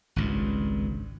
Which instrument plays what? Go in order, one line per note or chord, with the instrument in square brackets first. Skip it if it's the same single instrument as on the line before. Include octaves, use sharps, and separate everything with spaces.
[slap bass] G#1 C#2 G2